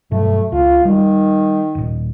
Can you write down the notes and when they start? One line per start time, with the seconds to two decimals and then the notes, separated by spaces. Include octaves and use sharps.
0.11 G2 B2 F#3 A3
0.52 C#2 F4
0.85 D#3 G3
1.75 D#1 A#2